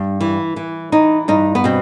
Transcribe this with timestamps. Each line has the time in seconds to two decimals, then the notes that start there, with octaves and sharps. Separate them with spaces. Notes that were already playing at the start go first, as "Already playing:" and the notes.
Already playing: G2
0.21 E3
0.56 E3
0.92 E3 D#4
1.28 G2 D#4
1.55 B3
1.64 B2 C4